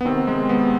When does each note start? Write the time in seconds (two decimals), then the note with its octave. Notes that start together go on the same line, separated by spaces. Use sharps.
0.01 B3
0.05 C3 D#3 C4
0.27 G#3
0.49 B3